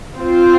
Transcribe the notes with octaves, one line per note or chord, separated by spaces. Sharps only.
C4 F4 C5